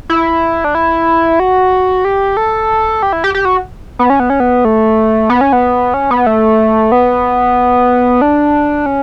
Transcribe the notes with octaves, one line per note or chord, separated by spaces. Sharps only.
E4
D4
E4
F#4
G4
A4
G4
E4
G4
G4
F#4
B3
C#4
B3
C#4
B3
A3
B3
C#4
B3
C#4
B3
A3
B3
D4
C#4